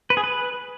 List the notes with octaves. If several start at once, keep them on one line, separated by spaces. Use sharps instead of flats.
B4
G#4
B4